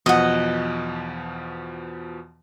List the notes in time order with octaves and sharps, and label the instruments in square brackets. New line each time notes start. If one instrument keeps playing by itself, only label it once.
[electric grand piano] E2 B2 F3 [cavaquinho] D#5 F#5